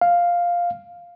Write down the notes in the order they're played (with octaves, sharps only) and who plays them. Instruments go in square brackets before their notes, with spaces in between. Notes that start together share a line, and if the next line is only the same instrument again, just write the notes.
[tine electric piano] F5